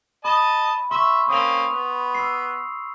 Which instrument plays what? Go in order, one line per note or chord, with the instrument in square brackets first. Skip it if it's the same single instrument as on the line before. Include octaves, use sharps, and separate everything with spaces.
[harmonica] D#5 A5 D#6 [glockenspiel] B5
[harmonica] E5 [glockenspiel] C6 C#6
[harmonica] A#3 C4 C#4 [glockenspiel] D#6 F7
[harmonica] B3
[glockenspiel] E6 C7